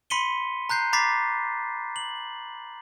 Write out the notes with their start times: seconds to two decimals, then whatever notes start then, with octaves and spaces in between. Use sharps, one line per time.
0.10 B5 C6 B6 C#7 D#7 G7
0.69 A#5 F#6 G6 C7
0.93 A#5 B5 D6 A6 B6 C7
1.96 F#7